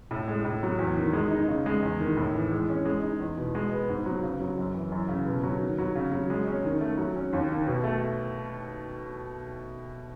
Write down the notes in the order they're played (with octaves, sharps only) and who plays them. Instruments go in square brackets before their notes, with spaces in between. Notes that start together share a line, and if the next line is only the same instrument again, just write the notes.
[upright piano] A2
G#3
A2
F#3
E2
D#3
G#3
D#4
C#3
G#3
E2
D#3
A2
E3
G#3
C#4
G#3
D#4
E2
B2
G#3
B3
G#2
F#3
C#3
F#3
F#2
E3
F#2
C#3
B2
F#3
D#3
F#3
C#3
F#3
G#3
C#4
D#3
A3
F#3
C#4
D#2
D#3
B2
A3